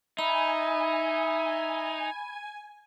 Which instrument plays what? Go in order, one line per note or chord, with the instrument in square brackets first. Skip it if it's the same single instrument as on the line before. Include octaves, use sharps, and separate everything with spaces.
[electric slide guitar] D#4 [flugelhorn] E5 [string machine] G#5 [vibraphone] B5